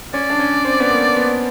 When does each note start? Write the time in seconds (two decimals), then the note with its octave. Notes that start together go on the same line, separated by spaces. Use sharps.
0.14 C#4 D5
0.30 D4
0.39 C#4
0.65 C4
0.80 B3
0.90 A#3
1.16 B3